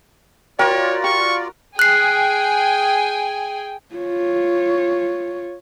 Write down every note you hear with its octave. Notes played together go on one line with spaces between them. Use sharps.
F4 F#4 A#4 C#5 D5 G5
G4 C#6
G#4 G5 G#5 F#6 C7
F4 C#5